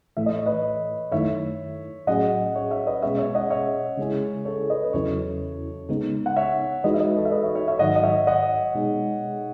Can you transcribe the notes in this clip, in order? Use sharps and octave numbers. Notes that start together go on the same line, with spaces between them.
A2 E3 A3 E5
D#5
C#5
B4 D#5
F#2 D#3 A3 E4 C#5 E5
A2 F#3 C#4 G#4 D#5 F#5
C#5 E5
C#5 E5
B4 D#5
B2 G#3 C#4 G#4 C#5 E5
C#5 E5
D#5 F#5
C#5 E5
C#3 G#3 C#4 E4 G#4
A4 C#5
B4 D#5
B4
E2 C#3 F#3 C#4 E4 A4 C#5
C#3 G#3 B3 D#4
F#5
C#5 E5
E3 G#3 D#4 F#4 B4 D#5
E5
B4 D#5
A4 C#5
E5
B4 D#5
C#5 E5
C#5 E5
C#5 E5
G#2 D#3 F#3 D#5 F#5
D#5
C#5 E5
D#5 F#5
B2 G#3 D#4 G#4